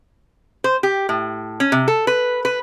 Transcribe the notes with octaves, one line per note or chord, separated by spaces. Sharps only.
C5
G4
A2
C#4
C3
A4
B4
B4